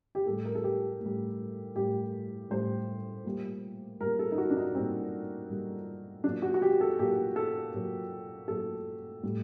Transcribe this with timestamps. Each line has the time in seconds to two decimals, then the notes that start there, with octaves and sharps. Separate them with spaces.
0.15 G4
0.26 A2 G3 A4
0.45 A#4
0.55 A4
0.64 G4
1.00 A2
1.06 G3
1.75 A2 G3 G4
2.50 A2 G3 C5
3.25 A#2 G3
4.00 A#2 G3 A#4
4.19 A4
4.32 D#4
4.38 F#4
4.50 D4
4.57 D#4
4.75 A#2 G3 C4
5.49 A#2 G3
6.24 A#2 F#3 D4
6.42 F#4
6.54 F#4
6.62 G4
6.81 A4
6.99 A#2 F#3 G4
7.36 A4
7.74 A#2 F#3
8.48 A#2 F#3 A4
9.23 A2 G3